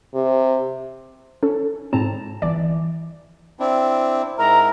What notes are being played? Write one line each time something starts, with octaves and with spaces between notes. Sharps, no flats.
C3
C#4 A4
G#2 C4 A5 A#5
G1 E3 D5
C4 D4 E4
G#2 E4 A#4 A#5